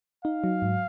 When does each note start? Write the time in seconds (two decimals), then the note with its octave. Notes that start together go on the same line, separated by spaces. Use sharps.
0.25 D#4 F5
0.44 F#3
0.62 G#2